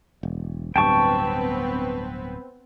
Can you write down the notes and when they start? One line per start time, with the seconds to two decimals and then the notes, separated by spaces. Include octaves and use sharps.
0.23 E1
0.76 D1 G2 B3 C4 B4 G5 A5 C#6